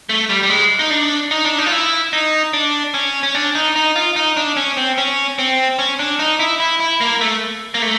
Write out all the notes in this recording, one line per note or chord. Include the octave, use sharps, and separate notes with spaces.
A3
G3
G3
G#3
D#4
D4
D#4
D4
D#4
F4
E4
D#4
D4
C#4
C#4
D4
D#4
D#4
F4
D#4
D4
C#4
C4
C#4
C4
C#4
D4
D#4
E4
E4
E4
A#3
A3
A#3
A3